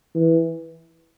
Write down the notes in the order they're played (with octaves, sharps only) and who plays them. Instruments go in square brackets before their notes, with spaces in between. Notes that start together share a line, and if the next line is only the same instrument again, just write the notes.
[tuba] E3